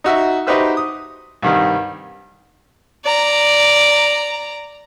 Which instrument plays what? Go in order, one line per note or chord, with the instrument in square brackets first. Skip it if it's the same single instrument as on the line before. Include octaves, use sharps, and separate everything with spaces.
[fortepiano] D#4 F#4 E5
D#4 F#4 G4 B4 C5 E5
D#6
C2 G2 D#3
[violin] D5 A#5